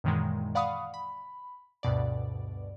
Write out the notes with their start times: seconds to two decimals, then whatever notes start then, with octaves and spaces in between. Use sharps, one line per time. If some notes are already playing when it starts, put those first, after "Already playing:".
0.04 F#2 A#2 D#3 E3 G#3
0.55 D5 F5 F#5 B5 C#6 D#6
0.94 B5
1.83 D2 G2 B2 D5